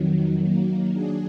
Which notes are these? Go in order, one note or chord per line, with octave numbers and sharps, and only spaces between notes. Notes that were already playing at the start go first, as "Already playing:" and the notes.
Already playing: F2 D#3 F#3
D#3 F#3 A#3
F#3 D4 G#4